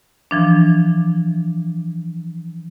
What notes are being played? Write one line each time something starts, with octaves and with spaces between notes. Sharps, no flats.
E3 F3 D4